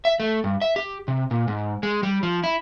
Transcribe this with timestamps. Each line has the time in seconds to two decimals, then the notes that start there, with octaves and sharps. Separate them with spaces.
0.05 E5
0.20 A3
0.44 G2
0.62 E5
0.76 G4
1.08 C3
1.31 A#2
1.48 G#2
1.83 G#3
2.03 G3
2.23 F3
2.44 E4